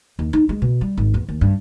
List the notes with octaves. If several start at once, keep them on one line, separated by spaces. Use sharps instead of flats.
D#2
D#4
G#3
B2
G3
G#1
E2
D#2
G2